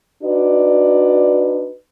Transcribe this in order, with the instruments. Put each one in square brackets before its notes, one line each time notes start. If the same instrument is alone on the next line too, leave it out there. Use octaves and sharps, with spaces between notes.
[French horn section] D4 D#4 F#4 B4 D5